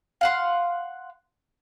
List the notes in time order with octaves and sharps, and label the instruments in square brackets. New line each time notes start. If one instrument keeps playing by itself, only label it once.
[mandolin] F5 F#5 C6